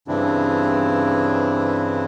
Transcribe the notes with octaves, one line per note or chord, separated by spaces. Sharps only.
G2 C#3 E3 C4 D4 E4